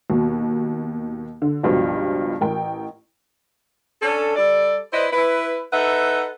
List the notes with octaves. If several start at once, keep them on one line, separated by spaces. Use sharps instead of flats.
D#2 B2
D3
C#2 G2 B2 F3
A1 A#4 G5
C#4 D4 A4
G3 A4 D5
E4 B4 C5 D5 D#5
E4 B4
D#4 A4 B4 E5 F#5